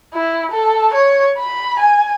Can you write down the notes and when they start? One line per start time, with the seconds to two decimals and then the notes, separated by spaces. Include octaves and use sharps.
0.14 E4
0.52 A4
0.94 C#5
1.38 B5
1.80 G#5